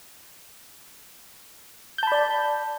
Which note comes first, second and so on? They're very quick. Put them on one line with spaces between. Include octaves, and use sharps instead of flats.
G6 A5 B5 D5